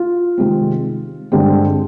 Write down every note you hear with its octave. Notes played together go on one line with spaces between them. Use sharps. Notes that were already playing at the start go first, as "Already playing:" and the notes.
Already playing: F4
C3 D#3 G#3 C4
G2 D3 G#3 C4